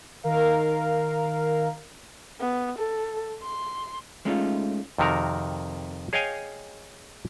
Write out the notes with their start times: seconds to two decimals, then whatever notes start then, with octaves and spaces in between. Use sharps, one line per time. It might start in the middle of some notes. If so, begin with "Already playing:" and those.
0.23 D#3 A#4 F5
2.40 B3
2.78 A4
3.43 C6
4.25 G#3 A3 C#4 D#4 F4
4.98 F2 C3 D#3 F#4 A#4
6.13 G#4 C#5 D#5 F5 G5 G#5